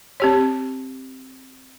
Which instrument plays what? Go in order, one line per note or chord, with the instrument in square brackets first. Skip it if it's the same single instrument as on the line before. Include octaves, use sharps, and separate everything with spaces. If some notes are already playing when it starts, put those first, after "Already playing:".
[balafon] C4 G4 C#5